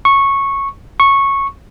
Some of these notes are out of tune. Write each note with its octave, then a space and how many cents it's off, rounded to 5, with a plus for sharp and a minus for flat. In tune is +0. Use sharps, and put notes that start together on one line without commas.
C#6 -10
C#6 -10